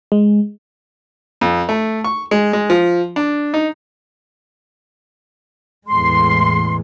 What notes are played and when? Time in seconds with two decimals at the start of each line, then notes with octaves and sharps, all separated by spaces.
0.12 G#3
1.41 F2
1.69 A3
2.04 C#6
2.31 G#3
2.53 G#3
2.70 F3
3.16 D4
3.54 D#4
5.87 E2 A2 G#3 C6